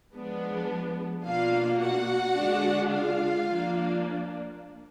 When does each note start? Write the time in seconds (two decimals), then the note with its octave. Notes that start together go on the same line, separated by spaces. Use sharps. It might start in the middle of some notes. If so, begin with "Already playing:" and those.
0.14 F3 G#3 B3 D4
1.24 B2 A#3 D4 F4 F5
1.80 F#4 F#5
2.35 D3 G#3 D4
2.91 F4 F5
3.47 F3 A#3 D4